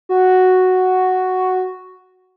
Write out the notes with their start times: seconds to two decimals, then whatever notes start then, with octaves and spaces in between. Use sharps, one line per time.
0.09 F#4